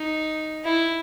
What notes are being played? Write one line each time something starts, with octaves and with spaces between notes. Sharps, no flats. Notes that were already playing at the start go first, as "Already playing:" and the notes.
Already playing: D#4
E4